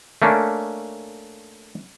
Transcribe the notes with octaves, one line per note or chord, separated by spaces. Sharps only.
A3 A#3 C#4 D4